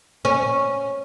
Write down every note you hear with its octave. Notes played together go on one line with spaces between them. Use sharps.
C#4